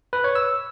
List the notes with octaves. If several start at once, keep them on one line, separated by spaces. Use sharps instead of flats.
B4
C#5
E6